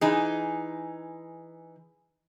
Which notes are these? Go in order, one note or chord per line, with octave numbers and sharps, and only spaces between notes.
E3 D#4 G#4